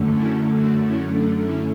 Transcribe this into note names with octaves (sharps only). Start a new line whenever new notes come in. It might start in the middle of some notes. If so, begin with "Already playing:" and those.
Already playing: F#2 D3 A3
C#4 E4
D4 F#4
C#4 E4
D4
C#4 E4